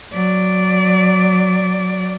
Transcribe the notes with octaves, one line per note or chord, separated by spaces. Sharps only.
F#3 D5